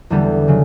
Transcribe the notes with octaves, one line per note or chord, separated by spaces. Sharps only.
E2 D3 G3 B3
C#3 F#3